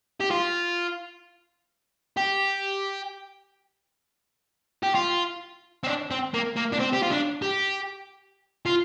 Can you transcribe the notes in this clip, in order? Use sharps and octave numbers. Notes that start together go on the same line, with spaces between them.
G4
F4
G4
G4
F4
C4
D4
C4
A#3
A#3
D4
C4
G4
F4
D4
G4
F4